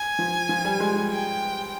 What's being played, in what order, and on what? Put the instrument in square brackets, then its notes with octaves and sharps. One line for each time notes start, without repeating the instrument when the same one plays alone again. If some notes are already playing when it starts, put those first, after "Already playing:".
Already playing: [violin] G#5
[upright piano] F3
F3
G3
G#3
G3
[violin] G5